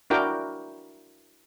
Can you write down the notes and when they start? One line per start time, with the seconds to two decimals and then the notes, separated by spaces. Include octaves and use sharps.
0.10 D4 E4 F#4 A#4 G5 D6